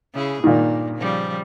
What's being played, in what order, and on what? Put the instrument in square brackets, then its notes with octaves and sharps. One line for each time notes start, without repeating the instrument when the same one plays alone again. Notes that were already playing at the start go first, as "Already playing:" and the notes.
[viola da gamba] C#3 E4 G#4
[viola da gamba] G2 A#3 [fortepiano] A#2 D#3
[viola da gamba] C#3 F3 G3